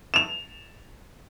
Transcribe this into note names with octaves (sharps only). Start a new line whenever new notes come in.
E7 F7